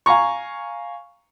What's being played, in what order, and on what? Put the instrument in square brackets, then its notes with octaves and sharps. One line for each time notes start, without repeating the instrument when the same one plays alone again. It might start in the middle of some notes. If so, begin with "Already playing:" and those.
[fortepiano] F5 G#5 A#5 C#6